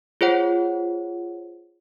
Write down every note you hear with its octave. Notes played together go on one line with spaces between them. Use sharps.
F4 G#4 C5 C#5 F#5